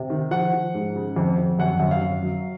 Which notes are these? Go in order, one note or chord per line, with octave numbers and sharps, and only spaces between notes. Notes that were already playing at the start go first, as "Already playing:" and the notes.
Already playing: C3
D#3
F3 F#5
F3
G#2
C#3
F2
F2
F#2 F#5
F#2
F5
F#2
F#3